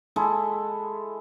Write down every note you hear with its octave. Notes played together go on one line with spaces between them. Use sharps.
G#3 E4 A4